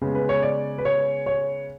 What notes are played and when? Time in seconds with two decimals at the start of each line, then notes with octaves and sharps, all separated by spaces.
0.01 C#3 G#3 B3
0.15 B4
0.29 C#5
0.42 D5
0.78 B4
0.85 C#5
1.26 C#5